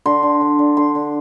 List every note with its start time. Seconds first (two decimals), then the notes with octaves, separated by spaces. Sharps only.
0.06 D3 C6
0.23 D3
0.41 D3
0.59 D3
0.77 D3 C6
0.95 D3